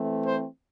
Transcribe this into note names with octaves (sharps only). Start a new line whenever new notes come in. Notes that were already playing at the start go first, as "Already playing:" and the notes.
Already playing: E3 A3 C4
C5